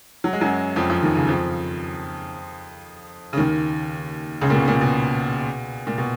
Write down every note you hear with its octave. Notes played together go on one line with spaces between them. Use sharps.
F#3
G#3
F#2 F#3
F2 F3
F2 F3
D#2 D#3
C#2 C#3
F2 F3
C#3
D#2 D#3
C#2 C#3
A#2
B2
A#2
B2
A#2
B2